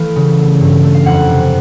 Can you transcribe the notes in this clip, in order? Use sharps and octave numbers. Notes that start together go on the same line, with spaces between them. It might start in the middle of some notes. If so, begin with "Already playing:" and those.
Already playing: E3 A3 F5
C#3
A3
G2
A3
F5
F2 F#5
C3